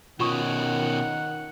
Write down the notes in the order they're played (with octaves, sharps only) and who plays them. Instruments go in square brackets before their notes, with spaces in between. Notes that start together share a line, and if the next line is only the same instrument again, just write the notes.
[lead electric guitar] B2 C#4 [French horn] D#3 [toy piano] F4 C#6 D#6 [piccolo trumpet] F#5